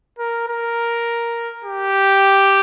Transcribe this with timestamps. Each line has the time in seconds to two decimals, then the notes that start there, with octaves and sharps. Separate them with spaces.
0.19 A#4
0.48 A#4
1.65 G4